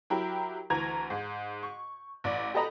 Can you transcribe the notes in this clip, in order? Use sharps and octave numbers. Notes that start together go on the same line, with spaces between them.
F#3 E4 G4 A#4
D2 E3 A#5 G#6
G#2
C#6
A1 D5
G4 A4 B4 D#5 A#5 B5